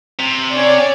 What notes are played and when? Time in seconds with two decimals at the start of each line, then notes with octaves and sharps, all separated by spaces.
0.19 C3
0.53 C#4 C#5 D5